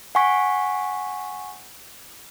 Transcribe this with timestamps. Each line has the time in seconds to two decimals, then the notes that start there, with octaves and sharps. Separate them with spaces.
0.15 F#5 G#5 C#6 B6